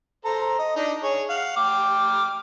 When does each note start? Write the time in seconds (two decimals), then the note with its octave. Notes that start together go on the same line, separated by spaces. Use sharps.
0.25 A4 C5 A#5
0.59 D#5
0.76 D4 D#4
1.03 G#4 C#5
1.30 F5 F#5
1.56 G5 D6 F6